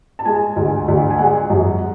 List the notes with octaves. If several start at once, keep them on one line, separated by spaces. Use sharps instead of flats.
A5
G#3 G#5
D2
D2
G#5
G#3 F#5
F#2